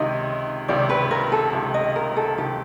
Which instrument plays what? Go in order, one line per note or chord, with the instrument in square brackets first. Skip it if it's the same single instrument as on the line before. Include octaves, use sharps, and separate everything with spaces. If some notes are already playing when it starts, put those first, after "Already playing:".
Already playing: [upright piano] C#2 C3 D#3 [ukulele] D#5
[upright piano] C#2 C3 D#3 [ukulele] D5
[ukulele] B4
A#4
A4
[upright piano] C#2 C3 D#3
[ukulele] D#5
A#4
A4
[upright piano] C#2 C3 D#3 [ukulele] G4